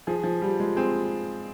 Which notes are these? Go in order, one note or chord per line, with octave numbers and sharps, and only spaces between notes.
F3 G#4
F3
F3 G3
G#3
C4 G#4